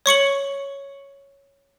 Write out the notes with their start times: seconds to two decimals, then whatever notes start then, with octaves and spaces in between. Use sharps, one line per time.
0.06 C#5 C#6 C#7 F#7